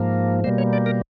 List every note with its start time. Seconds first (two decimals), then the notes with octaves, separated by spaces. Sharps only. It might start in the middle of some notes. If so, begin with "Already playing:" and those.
Already playing: G#2 F3 A#3
0.44 B2 G3 A#3 C5
0.58 C#5
0.73 D5
0.86 A#4